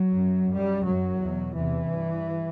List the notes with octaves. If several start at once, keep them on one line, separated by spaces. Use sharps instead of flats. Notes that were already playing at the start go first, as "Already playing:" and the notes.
Already playing: F#3
F#2
F#2 G3
F#2 F#3
E2 B2
E2 C3 E3
G2